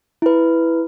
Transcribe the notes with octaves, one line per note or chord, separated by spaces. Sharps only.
E4 B4